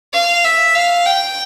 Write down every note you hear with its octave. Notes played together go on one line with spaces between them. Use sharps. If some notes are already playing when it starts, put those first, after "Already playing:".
F5
E5
F5
G5